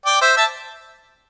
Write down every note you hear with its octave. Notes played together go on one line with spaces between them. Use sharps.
D5 G5
C5 E5
E5 A5